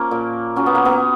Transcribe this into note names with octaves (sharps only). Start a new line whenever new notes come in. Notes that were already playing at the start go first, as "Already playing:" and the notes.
Already playing: F3 A#3 C#4
A#2
F#3 C#4
B3
A#3
B3